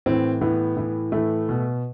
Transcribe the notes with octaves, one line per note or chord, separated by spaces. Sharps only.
A2 E3 C4
A2 E3 B3
A2 E3
A2 E3 A3
B2